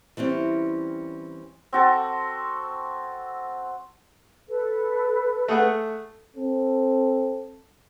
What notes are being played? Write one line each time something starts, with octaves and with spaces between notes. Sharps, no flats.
E3 G3 C4 C#4
C4 F#4 A4
A4 B4
A3 G#4 F#5
C4 A4